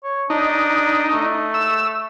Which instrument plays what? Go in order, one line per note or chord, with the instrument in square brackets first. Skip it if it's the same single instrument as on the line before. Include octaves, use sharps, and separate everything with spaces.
[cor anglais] C#5
[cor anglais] D4 [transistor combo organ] D#4
[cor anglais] A3
[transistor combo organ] E6